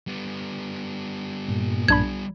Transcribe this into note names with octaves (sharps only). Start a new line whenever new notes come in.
G3 B3
G2 A#2
B1 D4 B5 G#6